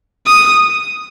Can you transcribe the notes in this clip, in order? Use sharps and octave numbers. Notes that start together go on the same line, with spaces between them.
D#6